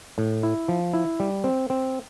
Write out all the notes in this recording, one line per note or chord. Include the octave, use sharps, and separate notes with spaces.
A2
E4
F3
E4
G3
C4
C4